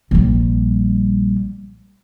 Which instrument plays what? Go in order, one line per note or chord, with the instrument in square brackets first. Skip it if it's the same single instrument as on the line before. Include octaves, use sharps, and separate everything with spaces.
[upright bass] A#1 G3